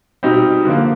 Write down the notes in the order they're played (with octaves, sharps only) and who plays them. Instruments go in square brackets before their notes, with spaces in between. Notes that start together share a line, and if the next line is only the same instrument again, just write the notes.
[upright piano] B2 G3 C4 D#4 G4
D3 F3 A#3